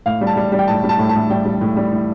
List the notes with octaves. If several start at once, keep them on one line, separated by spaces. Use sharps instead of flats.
A2 F5
G3
A5
G3
G3
G5
A2 A5
G3
A5
A2
A5
A2
G3 G5
G3
A2
G3
A2